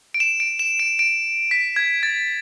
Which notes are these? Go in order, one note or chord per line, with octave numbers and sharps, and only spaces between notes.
D7
E7
D7
E7
D7
D7
B6
G#6
A6